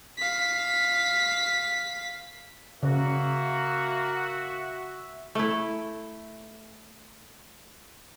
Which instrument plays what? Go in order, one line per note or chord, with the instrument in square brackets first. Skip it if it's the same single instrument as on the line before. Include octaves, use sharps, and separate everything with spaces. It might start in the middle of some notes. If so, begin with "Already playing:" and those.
[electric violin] F5 B6
[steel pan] C#3 [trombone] A#3 [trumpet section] F#4 [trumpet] E5
[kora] A3 E4